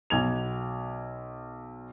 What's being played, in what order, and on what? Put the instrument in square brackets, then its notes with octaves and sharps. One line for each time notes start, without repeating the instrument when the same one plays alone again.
[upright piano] B1 G#6 F7